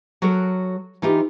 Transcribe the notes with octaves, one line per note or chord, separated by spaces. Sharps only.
F#3 F#4 A4 A#4
E3 D#4 F4 G4